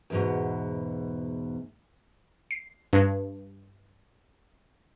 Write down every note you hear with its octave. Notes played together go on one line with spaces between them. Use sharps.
E2 G#2 B2
C7
G2